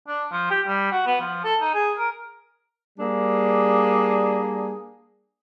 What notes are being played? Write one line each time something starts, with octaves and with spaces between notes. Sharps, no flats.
D4
F3
G4
G3
F#4
B3
F3
A4
D#4
G#4
A#4
G3 A#3 D4 G#4